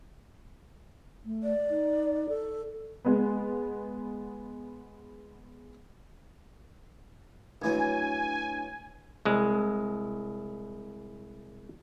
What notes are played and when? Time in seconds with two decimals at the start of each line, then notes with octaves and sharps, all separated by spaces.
1.25 A3
1.43 D5
1.70 D#4
2.29 A4
3.05 G#3 B3
7.62 A1 E3 F#3 D4 G#5
9.25 C2 G#3